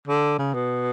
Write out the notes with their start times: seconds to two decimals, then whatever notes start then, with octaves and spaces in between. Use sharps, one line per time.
0.08 D3
0.39 C#3
0.54 B2